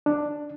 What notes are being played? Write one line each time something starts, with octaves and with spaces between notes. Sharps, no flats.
D4